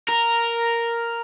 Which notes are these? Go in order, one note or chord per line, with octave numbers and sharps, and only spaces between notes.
A#4